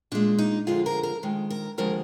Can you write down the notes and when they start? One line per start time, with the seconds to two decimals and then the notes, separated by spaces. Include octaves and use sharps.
0.12 A#2 G#3 D4
0.39 D#4
0.67 F2 D3 G#3 F4
0.86 A#4
1.03 A#4
1.23 F2 D#3 G#3
1.50 A#4
1.78 D#2 D3 F3 G#3 A#4